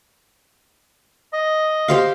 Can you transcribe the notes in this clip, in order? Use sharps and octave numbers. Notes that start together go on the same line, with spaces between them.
D#5
G4 C5 F5